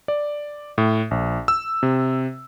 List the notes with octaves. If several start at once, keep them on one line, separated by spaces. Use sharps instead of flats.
D5
A2
A#1
E6
C3